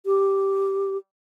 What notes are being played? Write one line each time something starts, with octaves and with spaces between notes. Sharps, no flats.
G4